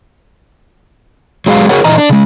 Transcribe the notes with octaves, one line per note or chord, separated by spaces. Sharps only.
F#3 G#3 G#4 E5 F5
F#4 G#4 A#4 C#5 F#5
A#2 E3 D#5 A#5
D4
C#3 G#3